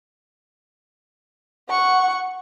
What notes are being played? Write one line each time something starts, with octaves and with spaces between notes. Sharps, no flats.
F#5 C#6